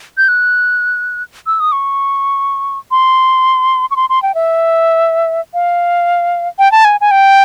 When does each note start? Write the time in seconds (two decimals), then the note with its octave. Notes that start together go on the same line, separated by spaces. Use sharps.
0.18 G6
0.28 F#6
1.47 E6
1.60 D#6
1.72 C#6
2.91 C6
3.91 C#6
3.96 C6
4.10 C6
4.23 G5
4.35 E5
5.54 F5
6.59 G5
6.72 A5
6.85 G#5
7.01 G#5
7.11 G5